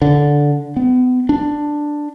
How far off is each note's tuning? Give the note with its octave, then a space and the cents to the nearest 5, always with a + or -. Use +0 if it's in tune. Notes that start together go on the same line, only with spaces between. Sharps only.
D3 -10
B3 +35
D4 +5